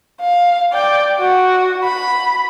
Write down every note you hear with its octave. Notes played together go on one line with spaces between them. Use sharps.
F5
D5 G5
F#4
B5